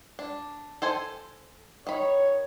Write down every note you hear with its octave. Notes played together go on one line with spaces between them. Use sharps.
D4
A4 C5 G#5
D#3 C#5 B5